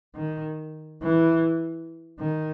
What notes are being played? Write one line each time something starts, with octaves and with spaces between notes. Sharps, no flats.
D#3
E3
D#3